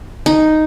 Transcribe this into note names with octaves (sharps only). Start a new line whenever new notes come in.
D#4